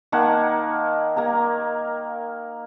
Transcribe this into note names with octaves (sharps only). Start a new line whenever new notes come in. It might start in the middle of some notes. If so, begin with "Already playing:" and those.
D#3 A#3 F#5 A5
A#3 A#4 A#5